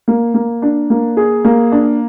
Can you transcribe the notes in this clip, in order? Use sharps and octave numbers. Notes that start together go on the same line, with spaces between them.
A#3
A#3
D4
A#3
G#4
A#3
D4